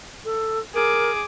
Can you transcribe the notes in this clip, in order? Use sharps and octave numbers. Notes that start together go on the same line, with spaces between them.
A4
G#4 A#4 D6